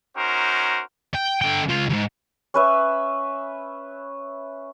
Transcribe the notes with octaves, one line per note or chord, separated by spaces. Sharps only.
C#4 D#4 F#4 A#4 C5
G5
D3 G5
C#2 F4
D2 G#2
C#4 B4 E5